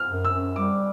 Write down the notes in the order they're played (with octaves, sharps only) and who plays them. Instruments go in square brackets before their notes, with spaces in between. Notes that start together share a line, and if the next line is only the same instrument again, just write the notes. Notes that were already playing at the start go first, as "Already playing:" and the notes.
Already playing: [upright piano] F6
[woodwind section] F#2
[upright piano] E6
[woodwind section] F#2
[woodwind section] G3 [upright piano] D6